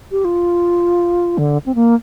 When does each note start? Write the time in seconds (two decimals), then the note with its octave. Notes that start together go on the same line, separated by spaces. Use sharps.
0.12 G4
0.25 F4
1.38 D3
1.66 C4
1.75 A#3